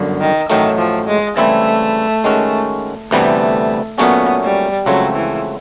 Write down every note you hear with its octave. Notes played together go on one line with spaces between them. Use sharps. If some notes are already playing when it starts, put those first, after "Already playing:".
Already playing: G1 F#2 D3
D#3
A1 A2 D#3 F#3 A3
F3
G#3
C#3 E3 G3 A3 C4 E4
D#3 G#3 C#4 F#4
D2 C3 E3 G3 A3 B3
A#2 F#3 A3 B3 C#4
G3
C#2 C#3 F3 F#3 A3 C4
E3